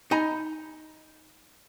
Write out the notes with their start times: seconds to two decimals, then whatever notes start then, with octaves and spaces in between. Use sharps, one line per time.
0.11 D#4 D#5 G#5 A#5 B5